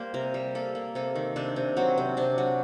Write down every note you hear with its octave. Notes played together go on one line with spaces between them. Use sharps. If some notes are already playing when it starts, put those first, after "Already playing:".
Already playing: G3 A#3 C5
C3 A#4
G3
A#3 A4
A#3
C3 A4
D#3
C3 D4
C3
F#3 C4
C3
C3 D4
F#3